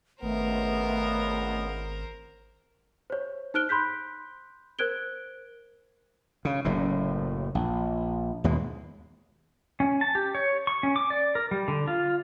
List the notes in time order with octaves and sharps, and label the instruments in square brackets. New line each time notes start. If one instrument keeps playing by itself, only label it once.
[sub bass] G#1 [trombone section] C#2 B3 [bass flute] A3 [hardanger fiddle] A#4 C5
[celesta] C5 C#5
D#4 C5 F6 F#6 D7 G7
B5 C6 F#6 G6 B6
A#4 C5 F#6 G#6 D7 G7
[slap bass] C#3
F#1 F#2 A2
A#1
D#2 B2 G#3
[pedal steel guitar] C#4
A5
G4
C#5
C#6
C#4
D6
D5
A#4
G3
D3
F4